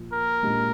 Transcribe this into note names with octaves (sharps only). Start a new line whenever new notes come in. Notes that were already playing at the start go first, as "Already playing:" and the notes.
Already playing: A#2 F3
A#4
A#2 G#3 D4 G4